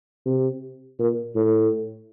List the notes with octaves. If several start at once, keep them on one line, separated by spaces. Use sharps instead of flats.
C3
A#2
A2